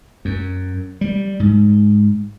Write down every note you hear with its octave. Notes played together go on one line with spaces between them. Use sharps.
F#2
G3
G#2